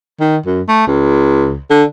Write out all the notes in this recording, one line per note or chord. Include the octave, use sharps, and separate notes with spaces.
D#3
F#2
A3
C#2
D3